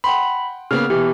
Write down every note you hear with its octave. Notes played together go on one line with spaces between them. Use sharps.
F#5 G5 B5 C6
C#3 A#3 B3 F6
B2 E3 G4